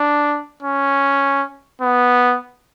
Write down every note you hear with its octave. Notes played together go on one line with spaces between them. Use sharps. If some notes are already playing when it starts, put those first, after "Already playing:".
Already playing: D4
C#4
B3